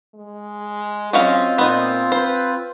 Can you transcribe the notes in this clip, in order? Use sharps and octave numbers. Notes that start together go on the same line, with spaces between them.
G#3
F#3 C4 C#4 F4 D#5 F5
A#2 B3 D#4
B4 C5